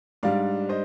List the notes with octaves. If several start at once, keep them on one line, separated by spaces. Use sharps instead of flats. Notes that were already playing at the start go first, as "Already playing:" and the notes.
G#2 G3 D4 D5 F5
C5 D#5